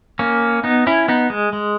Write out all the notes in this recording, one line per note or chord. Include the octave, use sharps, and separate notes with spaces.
A#3 C#4
B3 D#4
C#4 E4
B3 D#4
G#3
G#3